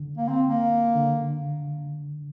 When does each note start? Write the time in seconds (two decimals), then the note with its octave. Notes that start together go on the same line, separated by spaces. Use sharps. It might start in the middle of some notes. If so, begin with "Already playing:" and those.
Already playing: D3
0.17 A#3
0.28 C4
0.47 A#3
0.96 D3